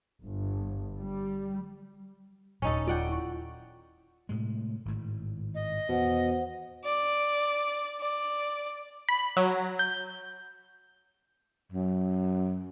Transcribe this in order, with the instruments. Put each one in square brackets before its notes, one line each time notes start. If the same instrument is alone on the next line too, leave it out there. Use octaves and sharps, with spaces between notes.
[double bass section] G1
G3
[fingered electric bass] D#1 G#1 [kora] C#4 D#4 A4
[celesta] F4 [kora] D5 F#5 G5
[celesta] E4 C#6
[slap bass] A2 C3 G#3
G#1 A2
[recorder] D#5
[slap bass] E2 [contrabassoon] B2 [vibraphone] C5 F#5
[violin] D5
D5
[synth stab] B5
F#3
G6
[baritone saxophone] F#2